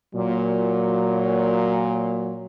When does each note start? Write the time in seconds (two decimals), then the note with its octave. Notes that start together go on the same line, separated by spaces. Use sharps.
0.15 A#2 F#3